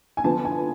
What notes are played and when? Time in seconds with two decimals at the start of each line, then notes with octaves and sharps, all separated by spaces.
0.17 G#5
0.24 D3 F3 B3 D4 A5
0.45 G#5